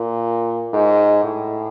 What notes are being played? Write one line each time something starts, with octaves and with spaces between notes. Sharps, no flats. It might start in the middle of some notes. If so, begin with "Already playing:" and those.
Already playing: A#2
G#2
A2